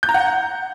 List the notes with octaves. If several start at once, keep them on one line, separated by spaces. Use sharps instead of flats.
G6
A#5
F#5